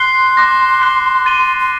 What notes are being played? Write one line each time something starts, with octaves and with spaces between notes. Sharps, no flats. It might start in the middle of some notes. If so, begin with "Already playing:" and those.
Already playing: C6 F#6 C7 G7
D6 F#6 A#6
F#6 C7 G7
A6 D#7 G7
C6